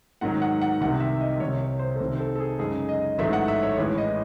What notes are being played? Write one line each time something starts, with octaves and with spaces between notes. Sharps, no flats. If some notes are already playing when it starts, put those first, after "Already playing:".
G#2 D#3 F#3 F#5
F#5
F#5
C2 C3 D#3 F#5
E5
D#5
C2 C3 D#3 C#5
C#5
C5
A4
C2 C3 D#3 C5
C5
A4
A4
G#4
F#2 C#3 G#3 D#4 G#4
D#5
A1 G#2 F#3 A3 E5
F#5
E5
C#5
A1 A2 E3 G#3 C#5
D#5